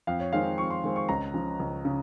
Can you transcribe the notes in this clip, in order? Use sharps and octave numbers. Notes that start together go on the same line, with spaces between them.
F2 F5
C#5
D#3 G#3 C4 F5
F2 C#6
C6
D#3 G#3 C4
C#6
C#2 A#5
C#3 F3
C#2
C#3